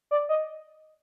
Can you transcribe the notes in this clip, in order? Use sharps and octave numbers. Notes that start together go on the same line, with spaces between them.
D5
D#5